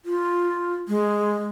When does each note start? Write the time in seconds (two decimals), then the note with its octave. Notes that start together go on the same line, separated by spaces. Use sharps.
0.05 F4
0.88 G#3